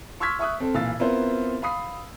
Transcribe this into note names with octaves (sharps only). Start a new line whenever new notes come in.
C6 C#6 E6 F6 G#6 B6
E5 C#6 D#6 F#6
C4 A4
B1 A#2 E3 F5 E6 A6
B3 C4 E4 F4 A#4 C5
F5 B5 D#6 C7